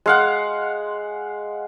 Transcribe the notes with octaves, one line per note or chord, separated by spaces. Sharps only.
G#3 F5 F#5